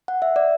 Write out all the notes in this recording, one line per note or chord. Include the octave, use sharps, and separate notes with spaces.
F#5
E5
D5